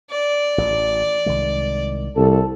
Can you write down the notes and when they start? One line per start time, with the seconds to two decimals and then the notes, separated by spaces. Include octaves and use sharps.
0.10 D5
0.58 A1
1.26 C2 D#3 G#3
2.16 C2 A4